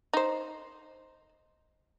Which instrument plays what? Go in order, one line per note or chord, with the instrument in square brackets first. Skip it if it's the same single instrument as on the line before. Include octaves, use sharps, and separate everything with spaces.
[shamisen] D#4 C5